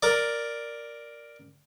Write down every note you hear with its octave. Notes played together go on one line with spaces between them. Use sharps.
A#4 D5